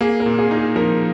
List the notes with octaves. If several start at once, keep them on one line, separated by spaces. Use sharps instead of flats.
A#3 G#4
A#4
A#2
G#4
D#4
G#4
F3 A#4